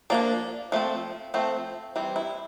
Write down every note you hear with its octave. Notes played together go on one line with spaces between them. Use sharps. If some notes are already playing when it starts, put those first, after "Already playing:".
F3 A#3 D4 D5
F3 A3 C4
F3 A3 C4
E3 G3 C4
E4